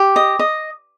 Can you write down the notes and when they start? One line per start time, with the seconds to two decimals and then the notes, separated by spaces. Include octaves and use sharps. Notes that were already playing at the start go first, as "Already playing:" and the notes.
Already playing: G4
0.16 D#5
0.39 D#5